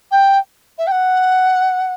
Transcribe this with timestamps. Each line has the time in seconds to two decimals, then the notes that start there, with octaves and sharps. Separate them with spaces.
0.11 G5
0.78 E5
0.86 G5
0.91 F#5